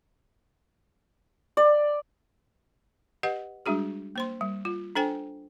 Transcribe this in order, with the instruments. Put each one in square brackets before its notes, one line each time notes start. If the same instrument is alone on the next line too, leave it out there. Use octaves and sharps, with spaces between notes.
[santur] D5
[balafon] G4 B4 D#5 F#5
G3 G#3 D4 F#4 G#4
A#3 C5 C6
G3
F4
D4 A4 C5 G5 G#5